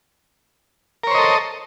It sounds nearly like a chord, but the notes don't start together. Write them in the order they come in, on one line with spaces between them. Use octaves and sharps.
A#4 C#5 C5 D#5 A4